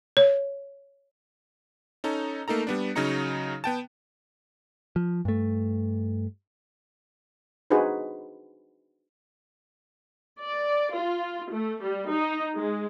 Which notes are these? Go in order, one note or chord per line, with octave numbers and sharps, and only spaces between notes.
C#5
C#4 D#4 A4 A#5
A3 A#3 D#4 A4 A#5
G3 B3 D4
C#3 F#3 C#4 D#4 A#5 C#7
B3 G5 A5
F3
G2 A3
D4 D#4 F#4 G#4 B4 C5
D5
F4
A3
G3
D#4
G#3